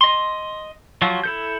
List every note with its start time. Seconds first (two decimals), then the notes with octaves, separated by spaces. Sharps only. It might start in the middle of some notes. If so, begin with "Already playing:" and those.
0.01 D#5 C6
1.02 F3 F#3 F4 F#4
1.24 E4 A4 G6